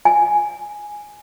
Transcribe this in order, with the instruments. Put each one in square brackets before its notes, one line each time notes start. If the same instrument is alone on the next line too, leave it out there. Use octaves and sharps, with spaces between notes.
[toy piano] G#5